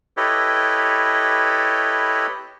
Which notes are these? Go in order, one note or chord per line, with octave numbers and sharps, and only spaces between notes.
E4 G4 A4 B4 C#5 D#5